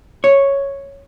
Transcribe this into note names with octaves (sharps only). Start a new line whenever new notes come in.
C#5